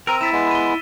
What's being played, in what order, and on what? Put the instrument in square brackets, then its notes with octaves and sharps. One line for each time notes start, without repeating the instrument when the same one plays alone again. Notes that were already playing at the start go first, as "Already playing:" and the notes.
[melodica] C4 A#5 [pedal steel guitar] A#4 [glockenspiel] E6 D#7
[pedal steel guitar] E4 [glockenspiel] A6 B6 E7
[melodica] G#3 B3
[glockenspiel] D#7 G7